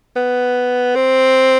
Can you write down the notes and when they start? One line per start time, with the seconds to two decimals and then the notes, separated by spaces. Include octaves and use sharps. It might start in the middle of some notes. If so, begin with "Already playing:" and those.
0.16 B3
0.95 C4